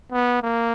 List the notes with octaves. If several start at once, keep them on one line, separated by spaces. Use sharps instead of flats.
B3
A#3